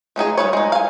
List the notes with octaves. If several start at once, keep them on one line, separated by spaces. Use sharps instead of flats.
A3 C#4 D#4 G#4
G3 F#4 B4 C#5
G#3 D#4
F5 G#5